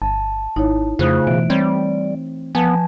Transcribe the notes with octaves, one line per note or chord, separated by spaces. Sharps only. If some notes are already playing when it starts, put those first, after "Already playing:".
G1 A5
G#1 D#4 E4 C#5
F2 C#3 A3 F4 C5 D#6 F#6
B2 E3 D7
G3 C4 C#5 G#6
F3 B3 B4 G#5 A5